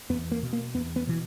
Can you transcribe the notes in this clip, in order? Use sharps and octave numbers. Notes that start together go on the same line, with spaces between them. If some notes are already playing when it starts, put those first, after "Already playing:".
E2 B3
A#3
B2
A#3
E2 B3
B3
B2 E3